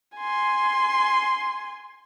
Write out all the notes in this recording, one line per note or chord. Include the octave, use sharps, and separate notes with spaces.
G#5 C6